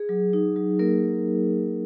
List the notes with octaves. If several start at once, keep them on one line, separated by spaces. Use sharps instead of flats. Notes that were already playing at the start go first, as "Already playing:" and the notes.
Already playing: G#4
F#3
D#4
F#3
A#3 A#4